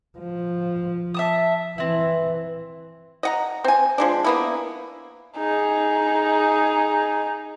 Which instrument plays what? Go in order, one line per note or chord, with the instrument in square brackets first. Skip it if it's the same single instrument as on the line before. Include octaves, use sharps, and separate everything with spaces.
[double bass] F3
[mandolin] E5 A5 D#6
[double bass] E3 [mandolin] C4 E4
[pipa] D#5 F#5 A#5
C4 G#5
F3 G#3 D4
A#3 B3 E4
[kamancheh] D#4 G#4